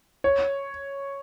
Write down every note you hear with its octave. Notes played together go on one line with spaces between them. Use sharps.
C#5